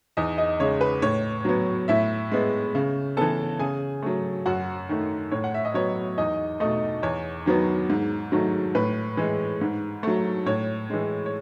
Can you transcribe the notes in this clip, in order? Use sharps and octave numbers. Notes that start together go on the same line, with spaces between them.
E2 D#4 D#5
D#4 D#5
C#3 G#3 C#5
B4
A2 C#5
F#3 B3
A2 E4 E5
G#3 B3
C#3
E3 B3 A4 A5
C#3 G#4 G#5
F#3 A3
F#2 F#4 F#5
D#3 A3
A2 C#5
F#5
E5
D#5
F#3 B3 C#5
E2 D#4 D#5
B2 A3 D#4 D#5
E2 C#5
D#3 F#3 B3
G#2
D#3 F#3 A3
A2 B4
E3 G#3
G#2
F#3 A3
A2 C#5
E3 G#3
C#5